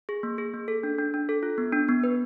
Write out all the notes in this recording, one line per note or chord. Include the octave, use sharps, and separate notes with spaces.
G#4
A#3
G#4
A#3
A4
D4
D4
D4
A4
F4
B3
D4
B3
B4